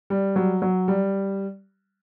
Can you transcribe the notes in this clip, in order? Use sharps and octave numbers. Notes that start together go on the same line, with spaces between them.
G3
F#3
F#3
G3